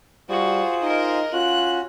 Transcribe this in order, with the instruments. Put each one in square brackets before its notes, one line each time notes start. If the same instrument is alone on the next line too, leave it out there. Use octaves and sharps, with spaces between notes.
[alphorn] G3 [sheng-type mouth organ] F4 G#4 C5 [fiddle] F#4
[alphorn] D#4 [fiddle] A#4 D#5
[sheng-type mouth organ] C#4 F#4 [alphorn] F4 [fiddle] F#6